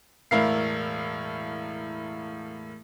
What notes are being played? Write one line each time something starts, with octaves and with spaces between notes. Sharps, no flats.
E1 A2 E4 A#4 F5 C7